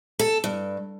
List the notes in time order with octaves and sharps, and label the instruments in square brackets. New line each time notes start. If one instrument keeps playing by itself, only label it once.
[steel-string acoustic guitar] A4
G2